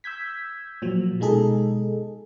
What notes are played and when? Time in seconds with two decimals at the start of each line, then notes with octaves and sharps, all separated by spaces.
0.04 E6 G6 G#6 B6
0.82 A#2 F3 F#3
1.20 B2 G#3 D#4 G#4 A4